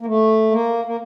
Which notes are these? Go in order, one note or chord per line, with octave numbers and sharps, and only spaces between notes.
A#3
A3
A#3
A#3